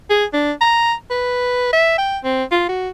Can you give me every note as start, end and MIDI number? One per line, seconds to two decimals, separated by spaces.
0.10 0.25 68
0.33 0.52 62
0.61 0.94 82
1.10 1.70 71
1.73 1.95 76
1.98 2.18 79
2.24 2.44 60
2.51 2.68 65
2.69 2.89 66